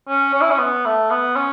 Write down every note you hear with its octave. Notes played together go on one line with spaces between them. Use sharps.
C#4
C#4
E4
C#4
B3
A3
B3
C#4